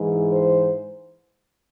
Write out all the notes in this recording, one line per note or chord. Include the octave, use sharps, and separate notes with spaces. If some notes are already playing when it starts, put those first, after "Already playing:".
Already playing: G#2 E3 G#3
C5